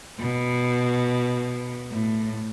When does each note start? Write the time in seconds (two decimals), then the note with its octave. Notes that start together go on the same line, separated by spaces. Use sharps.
0.19 B2
1.91 A2